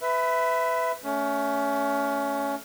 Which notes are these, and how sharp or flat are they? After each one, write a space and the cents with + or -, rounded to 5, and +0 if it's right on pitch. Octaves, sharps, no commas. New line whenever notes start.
B4 +20 E5 +0
A3 +5 C#4 +25